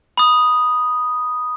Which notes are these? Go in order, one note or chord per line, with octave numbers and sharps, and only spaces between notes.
B5 D#6